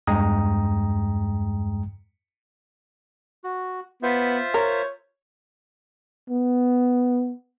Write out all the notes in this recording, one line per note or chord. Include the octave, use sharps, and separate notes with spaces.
E2 G2 G#3 G5 A#5 D#6
F#4
B3 F4 C5 E5
A#4 C#5
B3